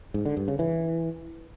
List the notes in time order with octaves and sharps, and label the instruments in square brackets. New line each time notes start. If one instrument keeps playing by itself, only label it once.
[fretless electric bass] G#2
D3
G2
C#3
E3